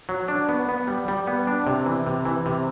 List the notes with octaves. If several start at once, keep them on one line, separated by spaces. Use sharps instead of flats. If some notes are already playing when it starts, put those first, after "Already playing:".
F#3
D4
B3
B3
G3
G3
B3
D4
C3
E3
C3
E3
C3